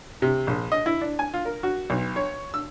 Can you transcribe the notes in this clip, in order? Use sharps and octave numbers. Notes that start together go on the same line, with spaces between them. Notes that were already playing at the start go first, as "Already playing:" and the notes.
C3
A#1
D#5
E4
D4
G#5
F4
A#4
F#4
B1
C#5
E6